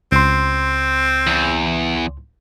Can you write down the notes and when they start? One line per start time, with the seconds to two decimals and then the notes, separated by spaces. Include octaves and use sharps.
0.12 C#2 C4 C6
1.27 E2